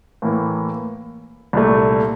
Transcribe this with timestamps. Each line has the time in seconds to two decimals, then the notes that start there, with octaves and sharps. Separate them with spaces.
0.22 A2 E3 A#3
1.53 C2 A#2 A3